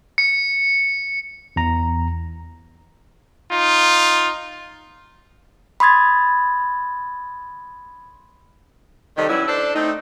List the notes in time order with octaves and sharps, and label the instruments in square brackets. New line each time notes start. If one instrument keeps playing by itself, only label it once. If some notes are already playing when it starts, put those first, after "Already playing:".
[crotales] C#7
[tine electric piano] E2 A#5
[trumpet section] D#4 F4
[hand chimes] B5 C6 D#6 G#6 A6
[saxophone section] C3 D#3 G3 D#4 A4
E3 F#3 G3 C#4 E4
D4 A4 C5 D5
A3 C4 D#4